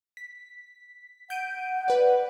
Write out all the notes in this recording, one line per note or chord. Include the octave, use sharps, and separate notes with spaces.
B6
F#5 G6 D7 D#7
B4 D5